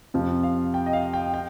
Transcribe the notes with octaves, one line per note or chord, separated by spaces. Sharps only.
F2 C3 F3
F5
G5
D#5
F5
G5
G5